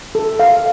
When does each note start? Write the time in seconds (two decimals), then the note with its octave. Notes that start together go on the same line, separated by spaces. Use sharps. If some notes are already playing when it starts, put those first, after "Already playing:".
0.15 A4
0.39 F5